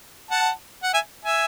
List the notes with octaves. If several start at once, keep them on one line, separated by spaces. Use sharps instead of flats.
F#5 A5
F#5
E5 G#5
E5 G#5